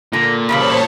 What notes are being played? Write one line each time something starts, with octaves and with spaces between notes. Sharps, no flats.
A#2 D3 A#5
E2 C#3 G3 C5 C#5 A5 B5